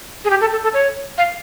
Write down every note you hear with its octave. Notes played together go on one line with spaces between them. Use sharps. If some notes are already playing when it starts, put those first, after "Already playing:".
G#4
G4
A4
A4
A4
C#5
F5